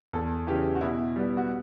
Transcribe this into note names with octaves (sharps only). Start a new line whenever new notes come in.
E2 A4
C#3 E3 G4
F#4
B2 E4
G3 B3
F#4